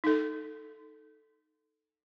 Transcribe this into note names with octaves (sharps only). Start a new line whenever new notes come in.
D#4 A4